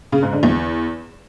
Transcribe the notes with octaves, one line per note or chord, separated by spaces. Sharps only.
C#3
G#2
D3
E2